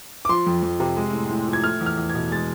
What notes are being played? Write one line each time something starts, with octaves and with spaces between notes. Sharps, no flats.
D6
F3 C6
F2
F2
C3
G#3
A2
A2
F3
G#6
A3 F6
E2
F6
E2
B2 G#6
G#3 A6